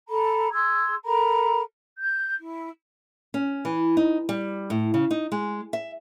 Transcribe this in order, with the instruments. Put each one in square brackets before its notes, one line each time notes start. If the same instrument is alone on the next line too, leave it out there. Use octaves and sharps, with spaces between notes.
[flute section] A4 A#5 B5
G#4 C6 E6 G#6
A4 A#4 A#5 B5
G6
E4
[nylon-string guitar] C#4
E3
D#4
G3
A2
C#3
D#4
G#3
E5